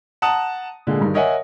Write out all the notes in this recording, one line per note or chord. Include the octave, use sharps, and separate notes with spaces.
F#5 A5 A#5 D#6
A#2 D3 G#3
G2 D#3
A#4 C#5 D#5 E5 F#5 G#5